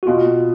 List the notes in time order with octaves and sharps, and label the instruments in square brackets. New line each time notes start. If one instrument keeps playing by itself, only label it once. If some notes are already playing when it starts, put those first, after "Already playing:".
[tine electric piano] F#4
[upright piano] B2 [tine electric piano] F4